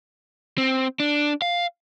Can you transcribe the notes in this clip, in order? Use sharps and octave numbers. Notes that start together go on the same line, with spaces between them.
C4
D4
F5